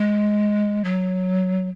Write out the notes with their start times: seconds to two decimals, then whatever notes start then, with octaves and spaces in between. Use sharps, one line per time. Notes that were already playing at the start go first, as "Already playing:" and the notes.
Already playing: G#3
0.84 F#3